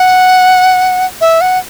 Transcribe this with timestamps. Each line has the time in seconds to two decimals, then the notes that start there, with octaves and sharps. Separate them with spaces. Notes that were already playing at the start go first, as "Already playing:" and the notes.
Already playing: F#5
1.21 E5
1.41 F#5